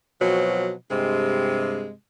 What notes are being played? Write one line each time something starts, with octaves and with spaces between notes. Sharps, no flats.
B2 F3 F#3 C4
G2 C3 G#3